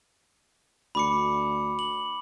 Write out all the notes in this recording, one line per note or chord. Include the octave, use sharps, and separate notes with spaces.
D2 B5 D6 C#7
F#7